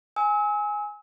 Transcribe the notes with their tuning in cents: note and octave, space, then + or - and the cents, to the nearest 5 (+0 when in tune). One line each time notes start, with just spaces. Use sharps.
G#5 +0 E6 -40